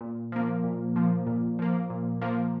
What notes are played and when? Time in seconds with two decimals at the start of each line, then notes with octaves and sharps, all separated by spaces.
0.01 A#2
0.32 F3 A#3
0.64 A#2
0.96 F3 A#3
1.27 A#2
1.59 F3 A#3
1.90 A#2
2.21 F3 A#3